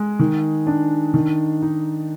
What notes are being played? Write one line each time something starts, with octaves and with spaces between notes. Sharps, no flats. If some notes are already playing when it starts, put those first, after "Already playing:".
Already playing: G#3
D#3
D4
D#3
D#4